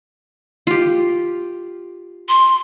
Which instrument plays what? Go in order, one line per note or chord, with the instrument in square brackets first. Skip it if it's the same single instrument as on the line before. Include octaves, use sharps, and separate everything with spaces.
[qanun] F4 G4
[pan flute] C6